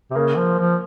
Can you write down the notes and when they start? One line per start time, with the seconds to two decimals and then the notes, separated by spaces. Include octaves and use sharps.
0.11 C3
0.16 C#3 A#3
0.37 F3
0.59 F3